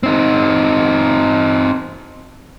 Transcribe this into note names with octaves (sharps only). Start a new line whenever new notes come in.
C4 D#4